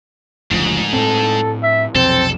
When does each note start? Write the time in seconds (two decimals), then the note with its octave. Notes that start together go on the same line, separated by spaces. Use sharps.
0.51 F#1 D2 G#2 F3
0.93 A2 C4 A4
1.62 E5
1.95 B1 F2 C3 C4 A4